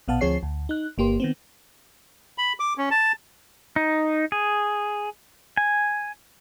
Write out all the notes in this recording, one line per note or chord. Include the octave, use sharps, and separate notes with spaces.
A#1 B2 B3 F5 F#5 A5
D2 F3 C4 G#4 C#5 C7
D2
D#4 F#6
G1 A#3 G4 C6
D#3 B3 C4
B5
D6
C#4
A5
D#4
G#4
G#5